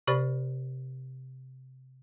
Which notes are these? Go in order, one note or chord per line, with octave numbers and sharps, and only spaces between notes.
C3 G4 C5 D5 B5 A6